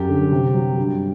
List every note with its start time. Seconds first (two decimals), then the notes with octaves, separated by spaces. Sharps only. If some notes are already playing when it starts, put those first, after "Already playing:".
Already playing: F#2 F#3 G4
0.08 D3
0.32 C3
0.54 F#3
0.78 G2